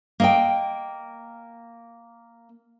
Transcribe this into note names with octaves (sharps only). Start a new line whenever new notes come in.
A#3 D#5 G5